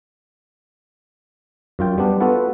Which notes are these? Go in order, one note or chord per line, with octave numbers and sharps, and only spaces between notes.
F#2 F4 G5
G3 B3 D4
B3 F4 F#4 A4 B4 F#5